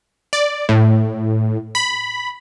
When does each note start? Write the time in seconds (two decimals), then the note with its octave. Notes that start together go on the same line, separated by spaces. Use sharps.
0.33 D5
0.69 A2
1.75 B5